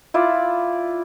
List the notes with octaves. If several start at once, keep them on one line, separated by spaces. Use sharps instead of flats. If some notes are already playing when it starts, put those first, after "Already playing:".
E4 F4 D5